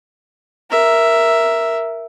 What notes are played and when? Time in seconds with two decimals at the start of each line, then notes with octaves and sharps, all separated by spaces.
0.71 A#4 E5